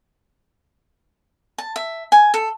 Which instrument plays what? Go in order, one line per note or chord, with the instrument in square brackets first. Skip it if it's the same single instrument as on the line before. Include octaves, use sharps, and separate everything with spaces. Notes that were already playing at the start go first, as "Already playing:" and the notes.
[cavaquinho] A5
E5
G#5
A4